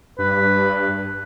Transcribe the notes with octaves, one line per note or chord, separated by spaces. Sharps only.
G2 B4